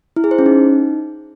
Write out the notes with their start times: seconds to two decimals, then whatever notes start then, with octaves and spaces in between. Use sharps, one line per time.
0.16 E4
0.24 G#4
0.31 C5
0.39 C#4
0.46 D#4